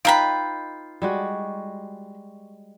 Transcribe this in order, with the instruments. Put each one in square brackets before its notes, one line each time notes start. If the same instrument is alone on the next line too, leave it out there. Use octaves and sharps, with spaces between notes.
[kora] D#4 B4 [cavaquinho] F4 G5 B5 [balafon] F5 A#5
[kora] G3 G#3 F#4